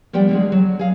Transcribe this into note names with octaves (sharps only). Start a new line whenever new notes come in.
F3 G3 B3 D5 G5
D3 G#3 G#4
F#3
G#4 F5